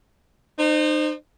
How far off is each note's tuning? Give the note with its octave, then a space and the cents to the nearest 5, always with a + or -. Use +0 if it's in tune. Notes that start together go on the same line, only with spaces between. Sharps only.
D#4 -35 C5 +0